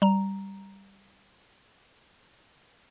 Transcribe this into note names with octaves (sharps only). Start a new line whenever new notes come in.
G3 A#5